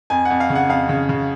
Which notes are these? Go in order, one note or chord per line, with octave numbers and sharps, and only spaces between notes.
F2 G#5
F2 F#5
F5
C#3
F#5
F2 F5
C#3
C#3